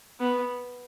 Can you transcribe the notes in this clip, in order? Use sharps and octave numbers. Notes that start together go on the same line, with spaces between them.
B3